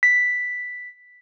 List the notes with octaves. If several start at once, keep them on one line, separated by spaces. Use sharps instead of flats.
B6